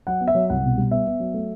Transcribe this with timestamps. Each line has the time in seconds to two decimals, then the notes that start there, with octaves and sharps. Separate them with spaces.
0.07 F#3 F#5
0.20 B3
0.28 E5
0.35 F#3
0.50 C2 F#5
0.64 B2
0.78 G3
0.91 B3 E5
1.06 B3
1.20 F#3
1.34 A3